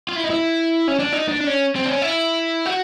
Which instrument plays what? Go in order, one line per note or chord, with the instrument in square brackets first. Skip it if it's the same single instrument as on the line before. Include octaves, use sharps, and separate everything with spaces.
[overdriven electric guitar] F4
E4
D#4
E4
C#4
D4
D#4
D4
D4
C#4
C4
D4
C#4
E4
F#4